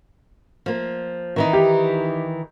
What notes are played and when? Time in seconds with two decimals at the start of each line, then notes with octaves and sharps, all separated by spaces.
0.66 F3 A#3
1.36 D#3 E3 D#4
1.53 G4